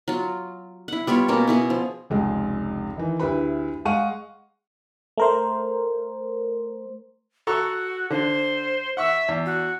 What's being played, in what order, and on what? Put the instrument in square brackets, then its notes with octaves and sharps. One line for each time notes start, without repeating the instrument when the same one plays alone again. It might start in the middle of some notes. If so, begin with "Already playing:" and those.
[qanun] F#3 F4
E4 F#5
G3 B3 F4 C#5
B2 A#3 C#4
B2 E4 G#4
F3
[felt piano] F1 C#2 G#3
D#3 E3
D2 E4 G4 B4 B5
G#3 F5 F#5 C#6 D#7
[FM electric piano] A3 A#4 C5
[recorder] F#4 [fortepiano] A4 A#5 C#6
[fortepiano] D3 [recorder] C5
[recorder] E5 [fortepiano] F#5 C#6 E6
[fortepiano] E2
[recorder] F#4